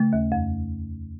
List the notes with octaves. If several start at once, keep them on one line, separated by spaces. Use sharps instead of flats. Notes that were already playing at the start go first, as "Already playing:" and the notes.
Already playing: C#3 A3
D#2
F2